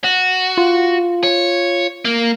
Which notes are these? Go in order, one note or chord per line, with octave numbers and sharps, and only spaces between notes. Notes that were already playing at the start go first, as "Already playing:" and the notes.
F#4
F4
C#5
A#3